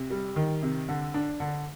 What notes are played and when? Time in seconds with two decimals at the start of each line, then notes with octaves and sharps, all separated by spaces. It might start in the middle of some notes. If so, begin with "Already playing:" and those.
Already playing: C3
0.10 G3
0.36 D#3
0.63 C3
0.89 D3
1.14 D4
1.40 D3